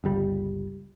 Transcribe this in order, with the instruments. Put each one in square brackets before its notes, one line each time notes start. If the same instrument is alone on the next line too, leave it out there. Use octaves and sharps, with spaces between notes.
[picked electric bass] G1 C#2 G3